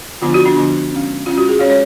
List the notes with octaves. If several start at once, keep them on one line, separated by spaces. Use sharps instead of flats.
D3 F3 B3 D4 F4
F#4
D4
D3 F3 B3 D4
G#3 C#4
G#3 C#4 F4
F#4
G#4
G#3 C#4 C#5
C#5